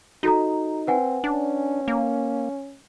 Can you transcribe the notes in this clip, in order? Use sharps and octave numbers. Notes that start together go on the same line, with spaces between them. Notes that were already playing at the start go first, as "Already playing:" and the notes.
D#4 F#4 A4 A#5
C4 B4 F#5 G#5
C#4 D4
A#3